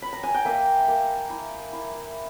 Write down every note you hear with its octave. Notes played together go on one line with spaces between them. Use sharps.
B5
A#5
G#5
G5
A#3 E5
A#3
E4
E4